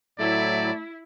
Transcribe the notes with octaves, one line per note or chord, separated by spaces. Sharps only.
A2 F#3 A3 E4 D5